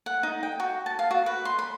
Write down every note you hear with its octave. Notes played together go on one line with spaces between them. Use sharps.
F#5
D#4
G5
F#4
A5
F5
F#4
B4
C6
B5